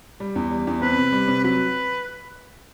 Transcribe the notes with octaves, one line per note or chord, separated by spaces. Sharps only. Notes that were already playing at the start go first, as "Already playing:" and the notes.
G3
E2
G3
E2
C4 B4
C3
G3
C3
F#3 B4